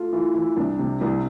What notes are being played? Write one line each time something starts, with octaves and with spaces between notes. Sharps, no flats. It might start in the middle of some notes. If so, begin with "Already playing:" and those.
Already playing: F4 A4
E3 F4
E3 E4
C2 D4
C3
C2 E4